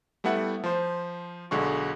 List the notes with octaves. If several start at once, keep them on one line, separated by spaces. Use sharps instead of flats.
G3 A3 B3 E4 F#5
F3 C5
B1 D3 G#3 F#4 C#6